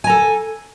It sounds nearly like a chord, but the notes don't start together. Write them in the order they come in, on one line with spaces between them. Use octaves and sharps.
G#5 A#5 A4